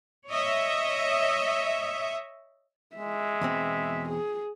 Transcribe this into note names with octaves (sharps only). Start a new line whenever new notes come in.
C#5 D#5 E5
G#3 E5
E2 B2 C4
G#4